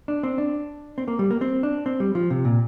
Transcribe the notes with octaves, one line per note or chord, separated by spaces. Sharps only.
D4
C4
D4
C4
A#3
G3
A#3
C4
D4
C4
G3
F3
C3
A#2